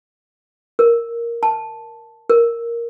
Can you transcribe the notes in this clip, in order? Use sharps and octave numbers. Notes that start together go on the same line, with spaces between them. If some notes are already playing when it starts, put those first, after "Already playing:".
A#4
A5
A#4